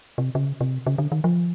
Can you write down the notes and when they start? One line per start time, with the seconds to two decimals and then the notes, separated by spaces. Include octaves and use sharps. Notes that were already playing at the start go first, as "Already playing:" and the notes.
0.18 C3
0.35 C#3
0.61 C3
0.87 C#3
0.98 D3
1.12 D#3
1.24 F3